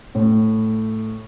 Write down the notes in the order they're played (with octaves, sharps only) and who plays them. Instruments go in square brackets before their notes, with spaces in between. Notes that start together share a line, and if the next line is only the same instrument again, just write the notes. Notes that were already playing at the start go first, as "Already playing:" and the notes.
[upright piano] A2